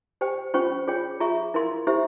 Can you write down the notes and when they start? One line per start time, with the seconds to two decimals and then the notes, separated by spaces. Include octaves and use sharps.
0.21 G4 C5 G5
0.54 C#4 F4 C5 G5 C#6
0.87 F4 G#4 C#5 G5
1.20 F4 G#4 E5 A#5 C#6
1.54 E4 A#4 F5 C6
1.87 E4 G4 C5 E5